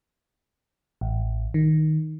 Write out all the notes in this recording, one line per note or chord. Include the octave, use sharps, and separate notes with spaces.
A1
D#3